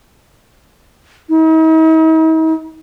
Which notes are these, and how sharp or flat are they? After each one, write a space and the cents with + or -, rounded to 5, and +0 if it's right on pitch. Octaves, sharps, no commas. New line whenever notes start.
D#4 +45